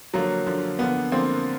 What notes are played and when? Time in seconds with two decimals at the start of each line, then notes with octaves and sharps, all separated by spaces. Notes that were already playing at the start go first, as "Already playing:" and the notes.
0.14 D3 F3 F#3 A#3
0.46 D3 F3 A#3
0.79 D3 F3 A#3 B3
1.11 D3 F3 A#3 C4